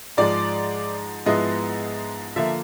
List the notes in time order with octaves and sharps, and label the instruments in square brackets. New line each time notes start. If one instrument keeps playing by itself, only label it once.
[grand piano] G#2 F3 G#3 D5
G#2 F3 G#3 B3 E4 D#5
D3 F3 A#3 E5